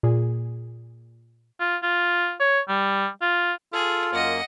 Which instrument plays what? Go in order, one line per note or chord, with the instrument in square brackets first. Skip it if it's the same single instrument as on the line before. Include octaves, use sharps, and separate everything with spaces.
[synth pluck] A#2 G#4
[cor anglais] F4
F4
C#5
G3
F4
[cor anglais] F4 [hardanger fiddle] G#4 [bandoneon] A4
[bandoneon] F#2 A#3 [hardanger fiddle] D#5 F#5